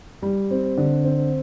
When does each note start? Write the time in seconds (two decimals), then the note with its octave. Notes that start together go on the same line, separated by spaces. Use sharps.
0.22 G3
0.51 C4
0.78 D3
1.04 C4